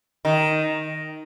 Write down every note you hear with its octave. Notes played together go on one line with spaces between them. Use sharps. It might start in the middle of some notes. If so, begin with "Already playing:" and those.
D#3